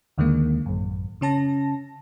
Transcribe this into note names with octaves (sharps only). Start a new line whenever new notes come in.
D#2 D3 D#3 G#3 A#3
A1 F#2
C#3 C#4 A5 A#6